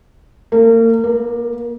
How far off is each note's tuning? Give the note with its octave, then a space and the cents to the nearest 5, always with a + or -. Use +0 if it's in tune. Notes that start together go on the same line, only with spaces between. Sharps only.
A#3 -35
A#3 +30